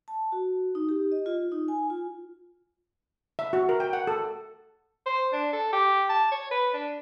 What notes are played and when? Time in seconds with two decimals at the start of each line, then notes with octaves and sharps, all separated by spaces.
0.08 A5
0.32 F#4
0.75 D#4
0.89 G4
1.12 D#5
1.26 F4
1.52 D#4
1.68 G#5
1.90 F4
3.39 E5
3.53 F#4
3.69 A#4
3.80 G5
3.93 F#5
4.07 A4
5.06 C5
5.32 D4
5.53 A4
5.72 G4
6.09 A5
6.31 C#5
6.51 B4
6.74 D4